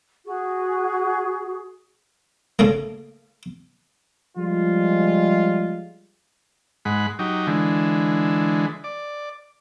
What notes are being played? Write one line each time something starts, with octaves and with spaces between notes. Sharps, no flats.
F#4 G#4
C#3 A3 A#3
F3 G3 G#3 F4
G#2 G#3 F#5 B5
F#3 D#4 G4
D3 E3 G#3
D5